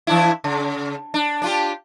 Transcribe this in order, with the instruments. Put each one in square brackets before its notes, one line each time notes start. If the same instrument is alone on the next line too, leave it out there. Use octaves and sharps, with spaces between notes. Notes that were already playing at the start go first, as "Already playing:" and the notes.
[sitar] E3 D4 E4
C#3
D4
D4 F4 G4